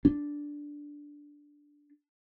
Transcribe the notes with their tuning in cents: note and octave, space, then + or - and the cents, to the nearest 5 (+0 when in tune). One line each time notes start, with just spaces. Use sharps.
D4 -5